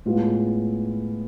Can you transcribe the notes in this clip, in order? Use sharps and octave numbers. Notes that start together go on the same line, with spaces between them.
A2 G#3 B3 F4